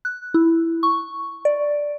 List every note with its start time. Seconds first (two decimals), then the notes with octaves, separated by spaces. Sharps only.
0.05 F#6
0.34 E4
0.83 C#6
1.45 D5